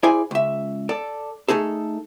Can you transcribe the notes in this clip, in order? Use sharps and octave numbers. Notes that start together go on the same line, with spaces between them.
E4 G#4 C5 D5 G#5
C#2 E5
A4 D5
A3 A#3 D#4 G#4 A4